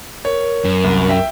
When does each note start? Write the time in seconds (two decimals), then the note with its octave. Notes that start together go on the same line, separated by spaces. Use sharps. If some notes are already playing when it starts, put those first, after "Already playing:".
0.25 A#4 C#5
0.65 F#2
0.84 C2
1.09 E5 G5